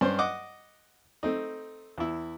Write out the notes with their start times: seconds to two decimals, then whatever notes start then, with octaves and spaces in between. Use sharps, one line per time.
0.01 G2 C#4 C5
0.19 D#5 F#5 D6
1.23 A3 C4 D#4
1.98 E2 E4